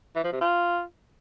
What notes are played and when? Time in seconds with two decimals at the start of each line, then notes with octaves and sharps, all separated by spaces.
0.16 E3
0.24 F3
0.32 C3
0.41 F4